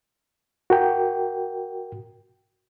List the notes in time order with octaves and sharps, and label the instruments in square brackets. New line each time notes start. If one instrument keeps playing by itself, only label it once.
[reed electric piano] F#4 A#4 G5